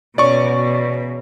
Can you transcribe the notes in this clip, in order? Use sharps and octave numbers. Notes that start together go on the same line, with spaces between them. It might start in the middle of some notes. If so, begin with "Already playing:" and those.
E2 B2 C#4 D5 C#6